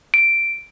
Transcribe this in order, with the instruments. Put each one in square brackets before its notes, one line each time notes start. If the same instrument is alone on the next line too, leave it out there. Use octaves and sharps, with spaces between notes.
[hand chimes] D7